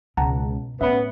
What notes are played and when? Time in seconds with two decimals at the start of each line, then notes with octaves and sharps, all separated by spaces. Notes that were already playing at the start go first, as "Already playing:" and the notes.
0.17 C#2 B2 F#5 A5 A#5
0.81 A2 B3 C#4 E5 B5